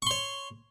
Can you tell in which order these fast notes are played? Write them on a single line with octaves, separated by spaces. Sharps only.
C#6 C6 C#5